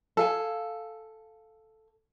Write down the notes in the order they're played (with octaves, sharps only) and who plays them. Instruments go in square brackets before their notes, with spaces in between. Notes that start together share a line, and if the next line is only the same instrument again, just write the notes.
[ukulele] A4 F5 G#5